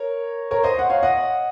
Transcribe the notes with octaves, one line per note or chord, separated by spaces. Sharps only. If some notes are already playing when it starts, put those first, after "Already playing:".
Already playing: A#4 C#5
A#4 C#5
C5 D#5
F#5
C#5 F5
D#5 F#5